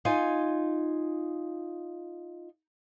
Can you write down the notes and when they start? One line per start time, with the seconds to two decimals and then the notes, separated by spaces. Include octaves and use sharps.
0.05 D#4 F4 G#5